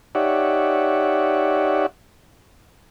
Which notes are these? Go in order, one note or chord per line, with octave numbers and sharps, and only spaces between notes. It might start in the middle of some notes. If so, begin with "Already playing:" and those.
D#4 G4 C#5 D5 E5 F#5